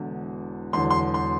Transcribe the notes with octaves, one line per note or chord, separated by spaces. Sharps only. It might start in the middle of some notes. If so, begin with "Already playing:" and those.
Already playing: E1 E2 D3
E1 E2 D3 F#3 C6
C6
C6